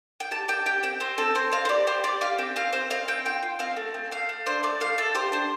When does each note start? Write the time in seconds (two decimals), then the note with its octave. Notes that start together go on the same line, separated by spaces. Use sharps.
0.20 G5
0.31 G4 A5
0.48 G4 G5
0.66 G4 G5
0.83 C4 G5
1.00 C4 C5
1.18 C4 A4
1.35 C4 C5
1.52 C4 F5
1.65 C5
1.69 G4 D5
1.87 G4 C5
2.04 G4 D5
2.21 G4 F5
2.38 C4 G5
2.56 C4 F5
2.73 C4 C5
2.90 C4 F5
3.08 C4 G5
3.25 F4 G5
3.43 F4
3.59 C4 F5
3.77 A3
3.94 C4
4.11 A3 F5
4.29 A3
4.46 D4 C5
4.63 A3 D5
4.80 A3 F5
4.98 A3 A4
5.15 G4 C5
5.32 D4 C5